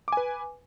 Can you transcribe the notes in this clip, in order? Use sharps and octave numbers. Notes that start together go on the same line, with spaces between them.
B4 G#5 D6